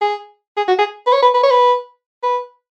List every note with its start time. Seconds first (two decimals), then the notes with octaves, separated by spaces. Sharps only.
0.01 G#4
0.57 G#4
0.68 F#4
0.78 G#4
1.06 B4
1.13 C#5
1.22 B4
1.34 B4
1.43 C#5
1.51 B4
2.23 B4